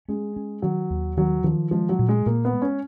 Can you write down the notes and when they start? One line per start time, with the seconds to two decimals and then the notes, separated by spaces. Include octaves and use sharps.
0.08 G#3 C#4
0.36 C#4
0.62 D#3 F#3
0.90 D#2
1.17 D#3 F#3
1.44 D#3 F3
1.71 F3 G#3
1.89 F#3
1.99 A#2
2.09 G#3
2.26 A#2 A#3
2.45 B3
2.53 G#3
2.62 C#4